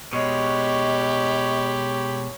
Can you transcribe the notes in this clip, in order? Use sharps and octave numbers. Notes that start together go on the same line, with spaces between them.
B2 G#3 G4 C#5 D#5 B5